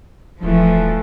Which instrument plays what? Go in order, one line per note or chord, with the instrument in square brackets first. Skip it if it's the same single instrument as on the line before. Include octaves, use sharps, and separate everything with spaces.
[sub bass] D#1 [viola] E3 A3 [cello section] F3